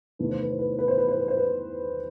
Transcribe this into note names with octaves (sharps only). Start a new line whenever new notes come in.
E2 C3 D#3 A3 D#4 B4
C5
B4
C5
B4
C5
B4
C5
B4
C5
B4
C5
B4